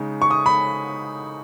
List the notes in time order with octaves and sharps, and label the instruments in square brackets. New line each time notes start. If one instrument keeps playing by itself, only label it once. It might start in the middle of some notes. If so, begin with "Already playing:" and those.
Already playing: [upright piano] C#3 G#3 D#4
C#6
D#6
B5